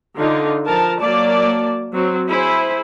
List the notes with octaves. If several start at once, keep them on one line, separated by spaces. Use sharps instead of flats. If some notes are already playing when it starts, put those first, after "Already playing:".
D3 D#4 F4
F3 A#4 A5
F#3 A#3 D5 A5
F#3 C4
E4 G#4 C5 G#5 B5